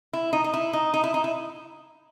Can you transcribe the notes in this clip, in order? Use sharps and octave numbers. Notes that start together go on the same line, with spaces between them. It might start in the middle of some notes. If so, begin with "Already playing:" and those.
E4
D#4
D#4
E4
D#4
D#4
E4
D#4
E4